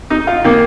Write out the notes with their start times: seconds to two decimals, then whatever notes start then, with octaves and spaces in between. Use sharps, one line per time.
0.10 D#4
0.27 F4
0.44 D#3 A#3